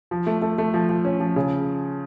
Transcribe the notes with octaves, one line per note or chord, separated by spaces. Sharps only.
F3
A3
A3
A3
F3
F3
C#4
F3
C#3